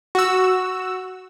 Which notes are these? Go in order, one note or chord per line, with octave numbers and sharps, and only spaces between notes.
F#4 E6